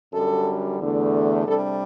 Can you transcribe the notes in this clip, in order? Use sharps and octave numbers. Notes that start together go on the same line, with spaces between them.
F#2 D3 G3 A4
E2 D3 A3
C3 G3 D4 A4